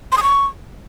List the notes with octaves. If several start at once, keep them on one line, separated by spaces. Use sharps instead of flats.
C6
D#6
C#6